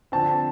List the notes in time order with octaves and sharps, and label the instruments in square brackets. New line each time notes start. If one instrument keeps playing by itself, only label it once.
[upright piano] D3 F3 C4 [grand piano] A5